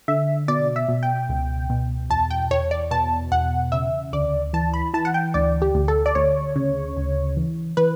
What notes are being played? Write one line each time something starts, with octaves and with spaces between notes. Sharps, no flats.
D3 E5
B2 D5
E5
B2
G5
C#2
B2
E2 A5
G5
E2 C#5
D5
B2 A5
E2 F#5
C#3 E5
D2 D5
E3 A5
B5
E3 A5
F#5
G5
D2 D5
G4
D2
A4
D5
D2 C#5
C#3
D2
E3
E3 B4